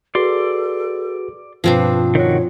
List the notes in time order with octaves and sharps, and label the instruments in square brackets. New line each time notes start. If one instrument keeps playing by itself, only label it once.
[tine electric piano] F#4 G#4 B4 [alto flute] A4 [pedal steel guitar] D5 C6
[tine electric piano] G2 B2 [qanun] F3 C4 D4 [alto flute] B4
[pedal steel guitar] D#3 F#4 [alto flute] C#5